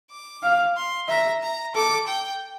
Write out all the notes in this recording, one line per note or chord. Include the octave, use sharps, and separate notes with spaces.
D6
F5
C6
E5 A#5
A#5
A4 D6
G5